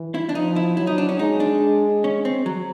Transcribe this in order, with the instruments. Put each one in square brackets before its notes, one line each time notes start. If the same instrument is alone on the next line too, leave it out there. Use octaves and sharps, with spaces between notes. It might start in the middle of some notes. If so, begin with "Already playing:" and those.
Already playing: [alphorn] E3
[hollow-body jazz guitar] E4
D4
[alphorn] F3 [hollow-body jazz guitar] D#4
[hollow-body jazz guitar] E4
[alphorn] F#3 [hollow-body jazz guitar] E4
[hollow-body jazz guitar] D#4
D4
C#4
[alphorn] G#3 [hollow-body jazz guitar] D#4
[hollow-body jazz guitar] D4
C#4
C4
F#3